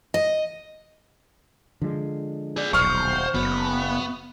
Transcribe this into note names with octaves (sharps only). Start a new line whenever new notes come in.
D#5
D3 F3 G#3
G#4 D5
D#1 B1 C5 C#6 F6
F#1 F#3 B3